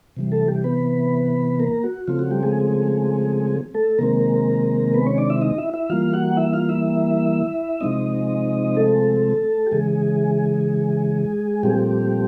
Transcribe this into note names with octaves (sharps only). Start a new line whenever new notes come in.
C3 E3 G3
A3 A4
G3 G4
B3 B4
A#3 A#4
F#4
C#3 F3 A3 C4 F4
F#4
G3 G4
G#3 G#4
A3 A4
C3 D#3 G#3 A#3 C4 A#4
B3 B4
C#4 C#5
D4 D5
E4 E5
D#4 D#5
E4 E5
E4 E5
E3 G3 A#3 F4 F5
F#4 F#5
E4 E5
F4 F5
E4 E5
C3 F3 G#3 C4 D#4 D#5
A3 A4
G4
C#3 E3 G#3 G#4
A#2 F3 G3 A3 C4 G4